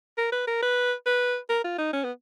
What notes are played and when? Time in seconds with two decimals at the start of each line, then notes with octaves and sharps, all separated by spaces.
0.18 A#4
0.32 B4
0.47 A#4
0.62 B4
1.06 B4
1.50 A#4
1.64 F4
1.78 D#4
1.93 C#4
2.04 B3